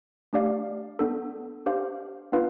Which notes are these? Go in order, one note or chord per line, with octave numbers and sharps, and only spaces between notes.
A3 D4 G4 D5 F5
B3 D4 A4
D4 G4 C5 F5
B3 D4 F4 B4 F5